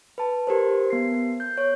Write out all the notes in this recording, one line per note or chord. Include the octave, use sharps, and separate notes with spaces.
B4 A5
G4 A#4 C5
B3 C7
G6
C#5